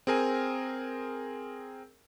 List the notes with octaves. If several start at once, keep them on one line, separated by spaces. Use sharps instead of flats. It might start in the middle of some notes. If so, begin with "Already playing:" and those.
C4 G#4 A#4 G#5